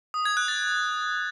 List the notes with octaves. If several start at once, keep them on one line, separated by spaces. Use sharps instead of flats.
D#6
G#6
F#6
A6